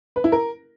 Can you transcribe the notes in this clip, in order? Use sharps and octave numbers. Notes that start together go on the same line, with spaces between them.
B4
E4
A#4